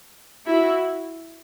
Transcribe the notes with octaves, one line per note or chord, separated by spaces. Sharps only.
E4 F#4